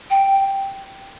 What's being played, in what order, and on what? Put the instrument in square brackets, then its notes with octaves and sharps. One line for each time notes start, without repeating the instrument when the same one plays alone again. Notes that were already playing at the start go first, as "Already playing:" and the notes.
[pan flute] G5